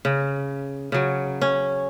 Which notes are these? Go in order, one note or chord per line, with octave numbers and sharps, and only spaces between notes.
C#3
C#3 F#3
C#4